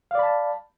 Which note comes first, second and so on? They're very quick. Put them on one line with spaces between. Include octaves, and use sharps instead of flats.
F5 D5 B5 A5